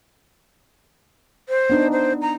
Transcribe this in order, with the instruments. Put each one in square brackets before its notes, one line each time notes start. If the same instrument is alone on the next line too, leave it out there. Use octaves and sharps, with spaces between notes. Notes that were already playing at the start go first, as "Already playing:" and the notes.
[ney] C5
[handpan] B3 D4 D#4
[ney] C5
A#5